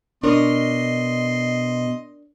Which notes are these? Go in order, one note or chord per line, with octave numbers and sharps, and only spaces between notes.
B2 D4 A#4 C#5 D#5 C6